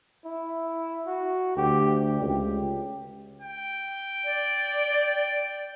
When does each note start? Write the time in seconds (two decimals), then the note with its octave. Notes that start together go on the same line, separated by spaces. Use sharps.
0.25 E4
1.07 F#4
1.57 D2 G4
2.21 C#2 G4
3.41 G5
4.25 D5